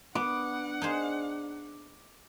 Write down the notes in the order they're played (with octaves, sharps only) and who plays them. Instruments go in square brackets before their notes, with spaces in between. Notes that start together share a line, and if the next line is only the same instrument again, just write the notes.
[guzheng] B3 [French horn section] D4 [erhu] F#5 [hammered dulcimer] D6
[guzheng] D#4 G#4 C5